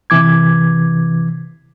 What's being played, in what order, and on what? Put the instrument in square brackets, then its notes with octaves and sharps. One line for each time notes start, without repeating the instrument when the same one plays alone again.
[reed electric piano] C3 E3 D6 G#6